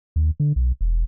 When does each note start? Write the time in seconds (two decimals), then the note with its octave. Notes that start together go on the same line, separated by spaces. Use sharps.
0.16 D#2
0.40 D3
0.56 B1
0.81 E1